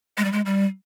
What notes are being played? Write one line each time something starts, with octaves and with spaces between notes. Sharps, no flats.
G#3
G3
G#3
G3